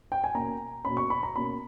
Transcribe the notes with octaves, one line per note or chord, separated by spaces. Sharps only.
G5
G#5
B2 A#3 C#4 A#5
B2 A#3 C#4 B5
C#6
B5
A#5
B2 A#3 C#4 B5